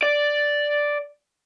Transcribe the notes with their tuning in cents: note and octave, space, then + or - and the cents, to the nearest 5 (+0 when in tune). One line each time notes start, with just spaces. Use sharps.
D5 +0